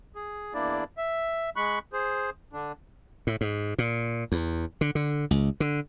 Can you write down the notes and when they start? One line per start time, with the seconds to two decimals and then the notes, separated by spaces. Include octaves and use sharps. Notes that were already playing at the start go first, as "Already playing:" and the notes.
0.15 G#4
0.54 E2 A#3 D4 E4 D5
0.97 E5
1.56 G#3 B5 C#6 F#6
1.93 G#4 C5
2.53 D3 D4
3.27 A2
3.41 G#2
3.79 A#2
4.32 E2
4.81 D3
4.95 D3
5.31 C#2
5.60 D3